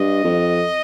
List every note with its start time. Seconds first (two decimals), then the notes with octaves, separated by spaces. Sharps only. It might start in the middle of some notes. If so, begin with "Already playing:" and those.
Already playing: G2 D#5
0.24 F2